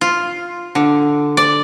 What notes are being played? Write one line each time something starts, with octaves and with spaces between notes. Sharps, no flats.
F4
D3
D5